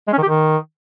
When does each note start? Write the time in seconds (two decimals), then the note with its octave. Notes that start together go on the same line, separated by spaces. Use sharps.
0.08 G#3
0.13 C#4
0.18 D#3
0.23 G4
0.28 D#3